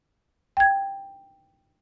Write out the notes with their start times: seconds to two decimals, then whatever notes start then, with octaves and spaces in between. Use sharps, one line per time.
0.57 G5 G#6